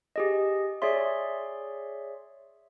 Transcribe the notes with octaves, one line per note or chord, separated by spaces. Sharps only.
G4 G#4 D#5
G#4 C#5 D5 E5 C6